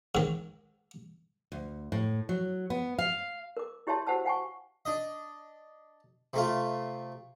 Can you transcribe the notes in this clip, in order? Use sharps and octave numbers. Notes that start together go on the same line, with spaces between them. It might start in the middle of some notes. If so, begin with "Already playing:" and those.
G#2 D#3
D2
A2
F#3
B3
F5
A#4 D6
E4 G4 C#5 E5 A5 C6
F#4 G4 C5 F#5 A5 E6
F5 F#5 G#5 A5 C#6
D4 D#5
C3 A3 F4